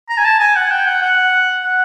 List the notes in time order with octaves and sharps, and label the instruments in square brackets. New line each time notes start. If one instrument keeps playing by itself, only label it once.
[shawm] A#5
G#5
A5
G#5
F#5
G5
F#5
F#5
F#5